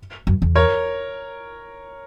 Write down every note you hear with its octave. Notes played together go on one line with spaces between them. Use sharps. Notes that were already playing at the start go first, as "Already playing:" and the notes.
F#2
E2
A#4 C#5